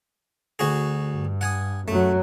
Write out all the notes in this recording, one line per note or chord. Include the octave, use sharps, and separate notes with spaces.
D2 F#4 G#4
G2
F#5 G#5 D#6
F#2 F#3 A3